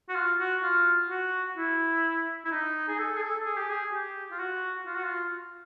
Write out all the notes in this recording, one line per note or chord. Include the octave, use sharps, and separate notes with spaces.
F#4
F4
F#4
F4
F#4
E4
E4
D#4
G#4
A4
G#4
A4
G#4
G4
G#4
G4
F4
F#4
F4
F#4
F4